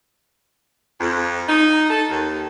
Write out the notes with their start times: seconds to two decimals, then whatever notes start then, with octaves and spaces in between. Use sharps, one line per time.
1.01 F2
1.49 D#4
1.90 A4
2.09 D#2